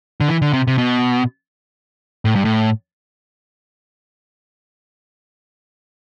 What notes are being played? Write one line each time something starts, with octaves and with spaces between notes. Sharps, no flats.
D3
E3
D3
C3
C3
B2
A2
G2
A2